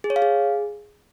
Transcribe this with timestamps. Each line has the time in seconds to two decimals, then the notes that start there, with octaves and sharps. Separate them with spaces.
0.04 G#4
0.10 C#5
0.16 F5
0.22 G#4